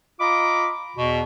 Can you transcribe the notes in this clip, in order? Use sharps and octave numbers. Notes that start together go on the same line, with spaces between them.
F4 D#5 A#5 B5 D6
E2 B2